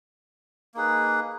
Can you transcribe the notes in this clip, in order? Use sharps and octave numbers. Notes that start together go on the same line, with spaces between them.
A#3 D#4 G#4 B4